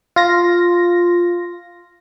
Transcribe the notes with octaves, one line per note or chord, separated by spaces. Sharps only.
F4 A#6